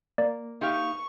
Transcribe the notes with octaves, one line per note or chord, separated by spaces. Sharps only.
A#3 D5
D#4 G4 F5 C#6